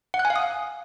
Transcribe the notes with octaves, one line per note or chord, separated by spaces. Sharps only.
F#5
F#6
G#5
F5
D#6